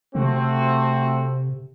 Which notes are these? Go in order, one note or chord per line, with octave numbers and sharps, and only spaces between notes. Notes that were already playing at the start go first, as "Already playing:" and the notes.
C3 A3 C4 F#4